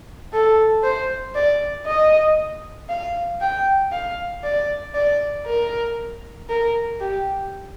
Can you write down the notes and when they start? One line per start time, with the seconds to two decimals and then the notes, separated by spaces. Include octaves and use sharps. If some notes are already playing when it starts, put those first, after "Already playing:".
0.33 A4
0.83 C5
1.35 D5
1.87 D#5
2.89 F5
3.41 G5
3.92 F5
4.44 D5
4.95 D5
5.47 A#4
6.49 A#4
7.00 G4